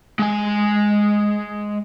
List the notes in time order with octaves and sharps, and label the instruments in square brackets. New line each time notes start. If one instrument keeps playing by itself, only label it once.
[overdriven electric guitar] G#3 G#5